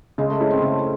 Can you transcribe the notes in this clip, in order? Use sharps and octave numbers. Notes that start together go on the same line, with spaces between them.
C#3 G#3
A3
G#3 C#4 E4
C4
C#3 A3
A3